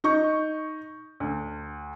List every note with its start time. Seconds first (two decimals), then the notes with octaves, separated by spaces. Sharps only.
0.04 D#4 C#6 G6
1.20 D2